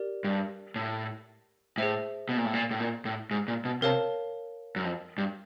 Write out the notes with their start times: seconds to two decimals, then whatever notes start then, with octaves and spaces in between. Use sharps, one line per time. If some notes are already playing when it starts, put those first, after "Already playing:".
Already playing: G4 A#4 D5
0.24 G2
0.76 A2
1.78 A2 G#4 C5 E5
2.29 B2
2.37 A#2
2.45 A2
2.53 A#2
2.71 A2
2.80 A#2
3.05 A2
3.31 G#2
3.48 A#2
3.65 B2
3.82 C3 A#4 C#5 F5 A5
4.76 F#2
4.84 F2
5.18 G2